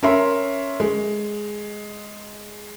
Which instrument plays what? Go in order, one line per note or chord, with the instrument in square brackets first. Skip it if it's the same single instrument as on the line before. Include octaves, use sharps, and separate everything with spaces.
[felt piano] C#4 A#4 E5 C6
G#3